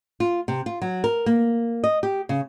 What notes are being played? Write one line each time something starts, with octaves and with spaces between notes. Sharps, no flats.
F4
C3
F4
F#3
A#4
A#3
D#5
G4
C#3